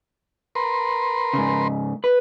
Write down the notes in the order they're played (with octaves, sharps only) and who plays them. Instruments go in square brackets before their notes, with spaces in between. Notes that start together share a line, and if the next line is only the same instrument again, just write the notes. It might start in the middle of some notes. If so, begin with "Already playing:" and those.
[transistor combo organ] A#4 B4 C6
[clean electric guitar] G#2 C#3
B4